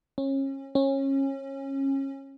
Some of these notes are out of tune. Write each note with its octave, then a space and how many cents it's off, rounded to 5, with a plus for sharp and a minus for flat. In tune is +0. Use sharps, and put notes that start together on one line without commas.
C#4 -30
C#4 -25